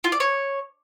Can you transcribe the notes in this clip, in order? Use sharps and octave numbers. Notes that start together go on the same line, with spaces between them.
F4
D5
C#5